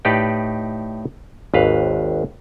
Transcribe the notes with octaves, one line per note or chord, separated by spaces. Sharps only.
A2 D#4 G4 B4 D5 D#5
G#1 D#2 B4 F5